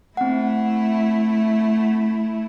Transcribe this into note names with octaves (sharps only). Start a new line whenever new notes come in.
A3 C4 E4 F#5